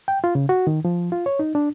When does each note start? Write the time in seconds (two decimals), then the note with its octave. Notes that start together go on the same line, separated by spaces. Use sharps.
0.08 G5
0.24 F4
0.35 C#3
0.49 F#4
0.67 D#3
0.85 F3
1.12 F4
1.26 C#5
1.39 D#4
1.55 D4